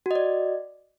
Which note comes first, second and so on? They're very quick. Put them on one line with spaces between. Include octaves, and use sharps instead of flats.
F#4 D#5 D5